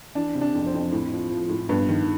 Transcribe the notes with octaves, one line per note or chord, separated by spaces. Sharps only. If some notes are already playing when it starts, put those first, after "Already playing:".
E3 D4
C3
D4
F2
C4
F2
A2
F3
F3
A2
G2 B3
D#3